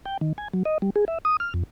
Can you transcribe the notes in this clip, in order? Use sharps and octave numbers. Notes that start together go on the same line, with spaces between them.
G5
D#3
G#5
F#3
D#5
G3
G#4
E5
D#6
F6
F2